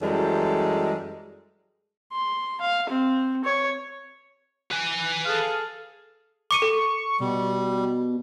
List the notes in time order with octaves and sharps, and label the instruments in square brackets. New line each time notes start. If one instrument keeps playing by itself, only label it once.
[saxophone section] F#2 E3 G3 G#3 A4
[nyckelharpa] C6
F5
C4
C#5
[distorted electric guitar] B4 G#5
[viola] G#4 A4 [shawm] F5
[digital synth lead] C#6 [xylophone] D6 C#7 D#7
[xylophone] A4
[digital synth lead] B2 [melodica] G3